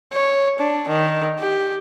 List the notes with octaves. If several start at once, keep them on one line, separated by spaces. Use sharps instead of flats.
C#5
D4
D#3
G4